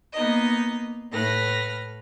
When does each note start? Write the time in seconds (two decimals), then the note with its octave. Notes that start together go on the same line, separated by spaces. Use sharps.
0.13 A#3 B3 D#4 D#5
1.11 A2 A3 A4 B4 F6 A#6